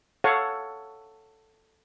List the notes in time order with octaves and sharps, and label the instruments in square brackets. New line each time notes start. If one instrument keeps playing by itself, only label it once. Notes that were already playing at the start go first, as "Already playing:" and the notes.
[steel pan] A4 C#5 F5 F#5